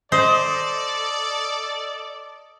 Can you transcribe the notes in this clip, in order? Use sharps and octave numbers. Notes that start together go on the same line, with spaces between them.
A4 C5 D5 D#5